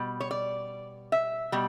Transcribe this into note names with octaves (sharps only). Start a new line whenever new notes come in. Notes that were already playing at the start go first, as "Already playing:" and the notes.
Already playing: B2 G3
C#5
D5
E5
B2 G3